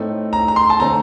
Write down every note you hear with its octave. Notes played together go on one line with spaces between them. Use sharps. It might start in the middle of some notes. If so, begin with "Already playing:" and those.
Already playing: A2 A3 C4 D#4
A#5
A#5
C6
A5
D3 A3 C4 A#5